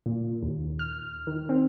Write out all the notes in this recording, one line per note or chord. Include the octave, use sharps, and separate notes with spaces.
A#2
D#2
F6
D#3
C4